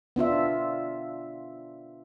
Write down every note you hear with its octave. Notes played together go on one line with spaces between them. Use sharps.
B3 D4 F4 E5